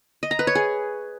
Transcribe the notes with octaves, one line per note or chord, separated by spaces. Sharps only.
D#5
A#5
B4
C#5
G#4